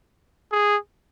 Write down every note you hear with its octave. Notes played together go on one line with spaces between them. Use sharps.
G#4